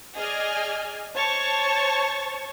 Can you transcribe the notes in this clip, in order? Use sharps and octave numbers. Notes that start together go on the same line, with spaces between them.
G#4 D5 D#5 G#5 F6
C5 C#5 A5 C#6 A6